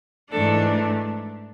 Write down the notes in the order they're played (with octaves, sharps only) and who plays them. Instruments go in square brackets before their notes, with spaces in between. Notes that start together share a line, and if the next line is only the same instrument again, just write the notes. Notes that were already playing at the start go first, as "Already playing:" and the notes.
[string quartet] G#2 E3 A3 D4 A4